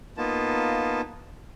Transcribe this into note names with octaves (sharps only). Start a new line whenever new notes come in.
A#3 B3 D#4 F4 A5